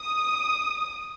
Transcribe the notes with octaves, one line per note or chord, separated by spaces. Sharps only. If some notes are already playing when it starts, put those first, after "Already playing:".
Already playing: D#6